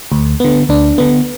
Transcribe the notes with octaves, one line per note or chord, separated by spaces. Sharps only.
D2
D3 B3
D2 D4
D3 B3